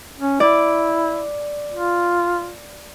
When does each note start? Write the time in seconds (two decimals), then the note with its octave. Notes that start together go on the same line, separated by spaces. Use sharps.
0.19 C#4
0.40 E4 D5
1.74 F4